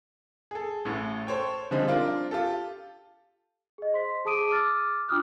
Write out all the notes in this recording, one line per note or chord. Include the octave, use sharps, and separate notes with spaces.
G#4 A4
A1 A2
A4 C5 C#5 G5
D3 F3 G3 G#3 C4 D#4
C4 D4 F4 A#4
F4 G4 A4
G#4 D#5
C5 C6 B6
G#4 A5 D6 D#6 D7 D#7
D6 E6 F6 A6
D4 F4 D6 D#6 F6 F#6